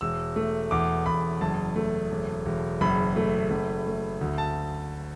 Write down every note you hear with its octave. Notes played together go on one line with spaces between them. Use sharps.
E1 E6
A3
E2 D6
E2 B5
F#1 A5
A3
E1
E1
F#1 B5
A3
F#1
A3
D2
A5